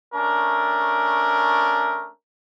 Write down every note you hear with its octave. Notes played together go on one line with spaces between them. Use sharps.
A3 C#4 D4 A#4